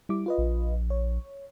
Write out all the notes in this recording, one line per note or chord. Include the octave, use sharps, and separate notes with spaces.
G3 E4 D6
F4 B4 D#5
A#1
C#5